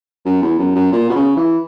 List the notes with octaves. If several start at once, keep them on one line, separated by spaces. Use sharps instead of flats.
F#2
E2
F#2
F#2
A#2
B2
C#3
E3